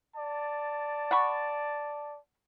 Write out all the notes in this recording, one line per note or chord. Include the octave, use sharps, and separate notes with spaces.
D5 A5
F#5 B5 C#6